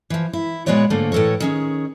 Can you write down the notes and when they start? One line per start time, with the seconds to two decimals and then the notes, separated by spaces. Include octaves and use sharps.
0.10 E3 F3
0.33 E4
0.66 A#2 G#3 B3 F#4 C#5 D5
0.90 G#2 D3 A3 A#3
1.12 A2 E3 A4 A#4 C#5
1.40 D#3 C#4 G#4